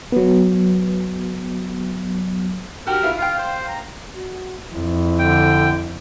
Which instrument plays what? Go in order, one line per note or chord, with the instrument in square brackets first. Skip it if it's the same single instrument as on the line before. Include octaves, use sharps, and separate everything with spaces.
[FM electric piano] F#3 B3
[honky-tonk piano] F#4 G4 [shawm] A#4
[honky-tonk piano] E4 F4 E5
[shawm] F4 [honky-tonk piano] F5 G5
[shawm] C5
A#5
[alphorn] F#4
[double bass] F2 [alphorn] E4
[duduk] D3 [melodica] G5